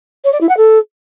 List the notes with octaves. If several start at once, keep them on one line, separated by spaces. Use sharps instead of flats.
C#5
D5
E4
F#5
A4